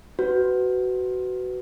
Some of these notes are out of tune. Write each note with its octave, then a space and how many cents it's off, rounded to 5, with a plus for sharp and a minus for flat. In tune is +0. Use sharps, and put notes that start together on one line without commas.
F#4 +15 B4 +15